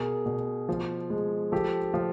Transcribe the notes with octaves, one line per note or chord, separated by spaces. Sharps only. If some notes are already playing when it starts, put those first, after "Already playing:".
Already playing: B2 G#4 A#4
B2
F3
G#3
F3 G4 A4
F3